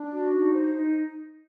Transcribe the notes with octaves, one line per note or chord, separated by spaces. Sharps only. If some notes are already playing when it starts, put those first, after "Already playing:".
Already playing: D4
F#4
D#4
C5
D#4